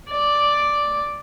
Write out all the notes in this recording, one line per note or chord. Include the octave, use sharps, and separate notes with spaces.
D5